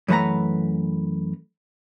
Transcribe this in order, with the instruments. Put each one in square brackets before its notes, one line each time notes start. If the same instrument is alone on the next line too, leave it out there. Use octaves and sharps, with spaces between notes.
[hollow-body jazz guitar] F#2 E3 A3 B4 F#5 A#5